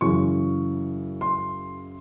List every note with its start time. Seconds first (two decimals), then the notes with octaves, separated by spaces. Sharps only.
0.01 F#2 C#3 E3 C#6
1.21 C6